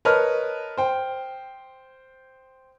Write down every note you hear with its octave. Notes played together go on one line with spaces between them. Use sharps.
A#4 B4 C#5 D#5 A5 F6
C5 G5